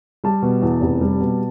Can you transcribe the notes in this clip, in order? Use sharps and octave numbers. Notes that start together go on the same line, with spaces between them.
G3 A5
B2
E2
F1
G3
B2